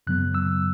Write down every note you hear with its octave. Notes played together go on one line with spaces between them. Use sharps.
F#2 C#3 F#3 B3 F#6
E6